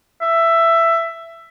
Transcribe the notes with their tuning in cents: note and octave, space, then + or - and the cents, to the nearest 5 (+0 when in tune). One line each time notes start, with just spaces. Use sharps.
E5 +15